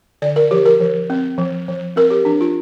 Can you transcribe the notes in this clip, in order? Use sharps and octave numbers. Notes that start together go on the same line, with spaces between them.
D3 D5
A#4
F3 G4
A#4
F3
C4
F3
F3
C4 A#4
G4
F3 D4
F4